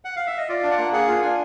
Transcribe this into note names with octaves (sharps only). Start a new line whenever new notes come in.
F#5
F5
E5
D#5
F4 D5
D4
F#5
A#3
G#4 F#5
F4
D4 G#5